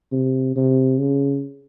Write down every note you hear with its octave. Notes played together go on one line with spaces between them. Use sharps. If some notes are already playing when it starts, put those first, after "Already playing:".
C3
C3
C#3